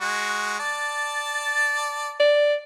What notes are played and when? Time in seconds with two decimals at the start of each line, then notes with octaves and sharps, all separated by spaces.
0.01 G#3 F#4
0.59 D5 A5
2.20 D5